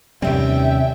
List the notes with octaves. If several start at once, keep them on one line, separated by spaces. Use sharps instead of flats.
D#2 C3 G3 C4 C#4 E5 G5